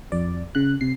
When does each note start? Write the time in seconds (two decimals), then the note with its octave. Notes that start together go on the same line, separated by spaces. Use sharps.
0.12 F2 D5
0.55 C#3 F#6
0.81 C3 C7